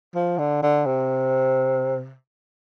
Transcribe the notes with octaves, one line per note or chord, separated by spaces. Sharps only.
F3
D3
D3
C3